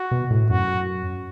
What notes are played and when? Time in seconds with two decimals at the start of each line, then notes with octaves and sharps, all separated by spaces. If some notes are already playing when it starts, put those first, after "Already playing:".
Already playing: F#4
0.11 B2
0.31 A2
0.50 F#2 F#4